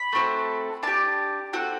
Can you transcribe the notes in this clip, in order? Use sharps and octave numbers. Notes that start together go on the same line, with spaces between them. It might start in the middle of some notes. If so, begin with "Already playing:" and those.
Already playing: B5
A3 C4 F#4 A4
D4 G4 A5
C4 F#4 A4